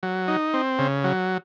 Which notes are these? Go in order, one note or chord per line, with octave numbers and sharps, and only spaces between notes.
F#3
D#4
C4
C#3
F#3